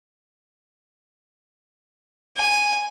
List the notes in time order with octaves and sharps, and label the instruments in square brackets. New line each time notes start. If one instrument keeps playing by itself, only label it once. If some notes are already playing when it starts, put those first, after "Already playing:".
[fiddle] G#5